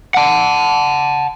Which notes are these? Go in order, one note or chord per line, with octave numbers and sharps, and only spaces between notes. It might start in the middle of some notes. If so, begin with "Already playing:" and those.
F#5 A5